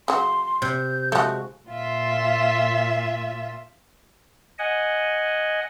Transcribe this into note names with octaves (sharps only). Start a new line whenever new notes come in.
C#3 F#3 C6
C3 G6
F3 G#3 A3 F#4
A#2 F4 E5
D#5 F#5 G#5